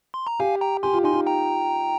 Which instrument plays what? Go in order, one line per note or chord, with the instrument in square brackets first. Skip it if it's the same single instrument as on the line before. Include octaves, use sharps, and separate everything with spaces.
[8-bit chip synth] C6
A#5
[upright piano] G4 [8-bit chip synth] F5 G#5
[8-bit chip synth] G5 A#5
[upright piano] G4 [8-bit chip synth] G#5 C6
[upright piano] F4
[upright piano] D#4 [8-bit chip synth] G#5 C6
[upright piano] F4
[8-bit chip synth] G5 A#5